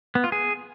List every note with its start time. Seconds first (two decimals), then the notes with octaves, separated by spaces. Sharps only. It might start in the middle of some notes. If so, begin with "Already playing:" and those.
0.15 B3
0.24 F4
0.32 G#4